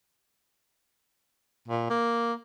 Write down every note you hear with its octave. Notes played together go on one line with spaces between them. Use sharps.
A#2
A#3